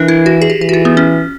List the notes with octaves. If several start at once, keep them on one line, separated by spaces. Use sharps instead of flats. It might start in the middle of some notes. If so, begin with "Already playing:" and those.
Already playing: E3 D4 A#4
E4
F#4
G#4
G4
E3 G4
F#4
F4
B3
C#4